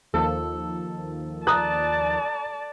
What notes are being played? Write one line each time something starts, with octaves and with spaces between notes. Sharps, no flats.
D#2 D#3 F3 A4
D5 A5 A#5 D#6 F#6